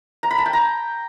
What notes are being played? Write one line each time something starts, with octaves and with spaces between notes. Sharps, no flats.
A#5
B5
A5
G5
A#5